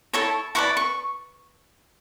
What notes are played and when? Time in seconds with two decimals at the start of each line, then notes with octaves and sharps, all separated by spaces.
0.13 E4 A4 C#5 A5
0.55 E4 B4 D5 C#6
0.77 C#6